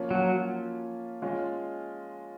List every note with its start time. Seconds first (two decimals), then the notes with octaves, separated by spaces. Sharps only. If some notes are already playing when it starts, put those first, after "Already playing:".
Already playing: F3 A#3 C#4 F4
0.11 F#3
1.22 G#3 C#4 F4